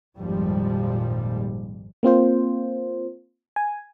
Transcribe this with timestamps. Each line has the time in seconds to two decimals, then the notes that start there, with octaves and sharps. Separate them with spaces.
0.18 G#1 F2 A#2 F3 G3
2.03 A#3 C4 F4 C5
3.56 G#5